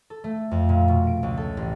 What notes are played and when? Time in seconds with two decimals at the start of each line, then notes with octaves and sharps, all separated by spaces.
0.10 A4
0.24 A3
0.51 F2
0.69 A#2
0.88 B2
1.07 D7
1.23 C#2
1.37 A4
1.57 A1